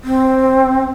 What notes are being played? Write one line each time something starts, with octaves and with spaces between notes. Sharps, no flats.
C4